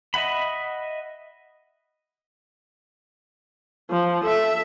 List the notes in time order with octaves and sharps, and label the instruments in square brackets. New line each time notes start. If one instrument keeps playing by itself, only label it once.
[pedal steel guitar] D#5 E5 F#5 B5
[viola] F3
A4 E5